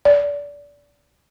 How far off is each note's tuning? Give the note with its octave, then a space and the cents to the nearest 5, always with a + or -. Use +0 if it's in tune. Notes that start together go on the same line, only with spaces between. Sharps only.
D5 -25